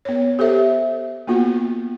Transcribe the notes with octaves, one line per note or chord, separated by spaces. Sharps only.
B3 C#5
G4 A4 C5 E5
A#3 B3 F4 F#4